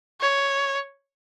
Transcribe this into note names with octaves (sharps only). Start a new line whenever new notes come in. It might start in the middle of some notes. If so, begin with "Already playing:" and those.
C#5